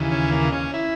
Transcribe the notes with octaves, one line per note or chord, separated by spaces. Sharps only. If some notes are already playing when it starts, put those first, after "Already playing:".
Already playing: D#2 C#3 E3
C#4
A#3
C#4
E4